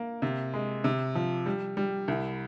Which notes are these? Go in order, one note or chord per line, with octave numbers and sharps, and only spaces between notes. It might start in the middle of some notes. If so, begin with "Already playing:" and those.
Already playing: A#3
C3
G#3
C3
F3
G3
G3
C2